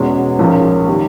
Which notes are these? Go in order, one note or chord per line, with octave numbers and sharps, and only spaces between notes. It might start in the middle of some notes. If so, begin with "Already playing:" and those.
Already playing: E2 B2 G#3 C#4
A#1 G#2 F3 A#3 C#4
D#3 G3